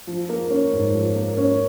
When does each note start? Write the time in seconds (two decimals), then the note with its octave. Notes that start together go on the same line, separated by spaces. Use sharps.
0.07 F3
0.29 A#3
0.50 C#4
0.72 G#2
0.94 F3
1.16 A#3
1.37 C#4